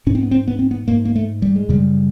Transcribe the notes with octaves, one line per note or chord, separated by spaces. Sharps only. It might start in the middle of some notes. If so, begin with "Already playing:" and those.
G#2 C#4
C4
B3
C4
B3
C4
B3
G#2 A#3
A#3
A3
G3
G#3
F#2 C#3 G3